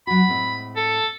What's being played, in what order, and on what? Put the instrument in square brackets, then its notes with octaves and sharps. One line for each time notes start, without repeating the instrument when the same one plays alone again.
[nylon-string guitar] F#3 F#4 [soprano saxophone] B5
[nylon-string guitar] A2 G#3 C4
[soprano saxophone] A4